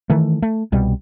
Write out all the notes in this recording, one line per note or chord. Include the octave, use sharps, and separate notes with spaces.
D#3 E3 A3
A3
C2 B2 G3